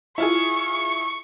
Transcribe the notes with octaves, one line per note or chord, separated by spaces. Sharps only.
E4 F4 G#4 C#6